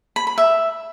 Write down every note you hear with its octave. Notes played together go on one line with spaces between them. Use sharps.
B5
B5
E5